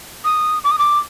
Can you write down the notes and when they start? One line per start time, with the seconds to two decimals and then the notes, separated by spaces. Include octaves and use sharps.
0.25 D#6
0.64 D6
0.71 D#6
0.79 D6